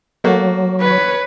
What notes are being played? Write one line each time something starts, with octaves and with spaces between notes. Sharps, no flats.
F#3 A3 A#3 F#4
B4 C#5